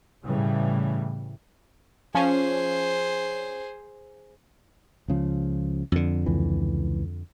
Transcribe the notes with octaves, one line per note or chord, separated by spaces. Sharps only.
A2 C#3 E3 G3
F3 C#4 G#4 C5
C#2 C#3 F3
F2 D3
C#2 E3